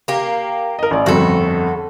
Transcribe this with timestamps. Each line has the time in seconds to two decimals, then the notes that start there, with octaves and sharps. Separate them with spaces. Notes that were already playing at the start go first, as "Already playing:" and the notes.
0.08 A#3 G4
0.79 A#4 D#5
0.91 A1 D5
1.06 G1 F2 F#4 A4